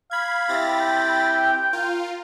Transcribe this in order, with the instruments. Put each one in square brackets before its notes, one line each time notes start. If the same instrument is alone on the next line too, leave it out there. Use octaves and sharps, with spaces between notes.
[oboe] F5 [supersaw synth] B5 G#6
[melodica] C4 E4 G4 [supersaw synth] B5 A6 A#6
[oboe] G5
[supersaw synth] F4 [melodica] A#4